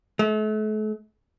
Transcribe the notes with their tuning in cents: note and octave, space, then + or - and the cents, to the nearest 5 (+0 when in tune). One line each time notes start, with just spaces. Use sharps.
A3 -40